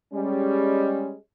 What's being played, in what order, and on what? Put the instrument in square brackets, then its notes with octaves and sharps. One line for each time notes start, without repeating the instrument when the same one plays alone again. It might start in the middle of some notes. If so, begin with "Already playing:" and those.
[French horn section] G3 G#3 C#4